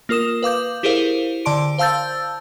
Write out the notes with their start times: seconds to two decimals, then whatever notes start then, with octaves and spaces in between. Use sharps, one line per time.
0.09 A#3 F4 A#4 D#6 E7
0.43 B4 F5 D6 G6
0.83 E4 G4 G#4 A#4 C5 F5
1.45 D3 D5 A5 C6 D7
1.78 C5 F5 A5 E6 G6 A6